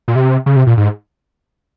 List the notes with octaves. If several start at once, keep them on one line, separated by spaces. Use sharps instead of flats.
A#2
C3
C#3
C3
A#2
G#2